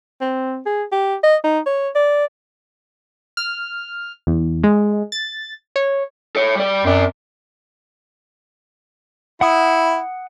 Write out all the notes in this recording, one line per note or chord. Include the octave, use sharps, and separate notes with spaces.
C4
G#4
G4
D#5
D#4
C#5
D5
F6
E2
G#3
A6
C#5
A4 C#5
G3 D5
F#2 C4 D5
E4 F#5 D#6